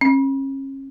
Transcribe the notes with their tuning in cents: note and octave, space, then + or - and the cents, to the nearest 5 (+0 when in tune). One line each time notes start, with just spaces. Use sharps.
C#4 -35